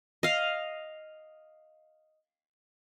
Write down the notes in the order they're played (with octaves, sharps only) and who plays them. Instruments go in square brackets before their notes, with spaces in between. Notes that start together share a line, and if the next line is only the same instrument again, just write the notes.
[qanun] D#5 F5